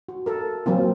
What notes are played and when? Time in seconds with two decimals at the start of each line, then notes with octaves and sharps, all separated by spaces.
0.08 F#4
0.26 A4 A#4
0.66 F#3 A#3 C4 F4